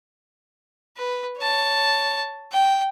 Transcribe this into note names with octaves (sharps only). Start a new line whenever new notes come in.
B4
C#5 A5
G5